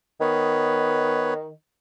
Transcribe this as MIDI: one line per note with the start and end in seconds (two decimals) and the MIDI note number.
0.21 1.50 51
0.21 1.34 59
0.21 1.34 71
0.21 1.34 73